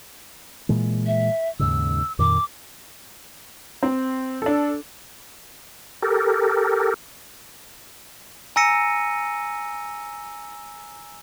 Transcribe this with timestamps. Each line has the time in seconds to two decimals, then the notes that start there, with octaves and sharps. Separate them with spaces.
0.69 A#2 E3 G#3
1.06 E5
1.59 D#2 G#2 C#3 E6
2.19 F2 A#2 D#3 D6
3.83 C4
4.42 D4 A4
6.02 G4 A4 A#4
8.56 G#5 A#5 E6 A#6 C#7 D#7